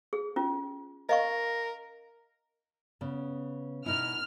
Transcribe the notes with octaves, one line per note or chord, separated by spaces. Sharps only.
G#4
C#4 F4
A#4 D#5 F5 C#6
C#3 B3
B2 D#4 E4 F6